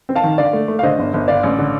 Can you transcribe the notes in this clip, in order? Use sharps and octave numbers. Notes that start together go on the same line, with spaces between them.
C4
F5 A5
D#3
D3 D5 F5
A3
A3
F5
D3 C5 D#5
G1
G1
D3 D5 F5
A1
D3